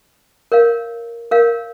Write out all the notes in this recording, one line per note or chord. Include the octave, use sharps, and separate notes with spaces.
A#4 C#5 F5
A#4 C#5 F5